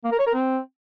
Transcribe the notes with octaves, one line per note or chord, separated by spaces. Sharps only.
A#3
A#4
C#5
A#4
C4